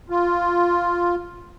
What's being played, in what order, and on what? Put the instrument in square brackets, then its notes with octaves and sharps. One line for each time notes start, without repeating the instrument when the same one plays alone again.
[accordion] F4